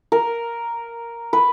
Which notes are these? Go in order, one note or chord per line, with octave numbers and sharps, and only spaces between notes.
A#4
B4